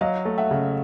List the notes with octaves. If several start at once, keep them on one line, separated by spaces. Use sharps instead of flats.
F#3 D#5 F5
A3
E5 F#5
C#3